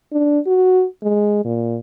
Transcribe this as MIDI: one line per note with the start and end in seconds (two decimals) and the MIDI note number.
0.12 0.39 62
0.47 0.85 66
1.03 1.41 56
1.45 1.78 46